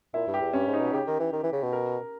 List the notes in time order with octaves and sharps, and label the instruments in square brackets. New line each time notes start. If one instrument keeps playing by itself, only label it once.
[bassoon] A#2 [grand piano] E4
[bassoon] G2
[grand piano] G4
[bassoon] E2
[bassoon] G2 [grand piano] C#4
[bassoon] G#2
[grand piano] D#4
[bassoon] B2
[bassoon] C#3 [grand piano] G4
[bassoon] D#3
E3
D#3
E3
C#3
B2
[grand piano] A#4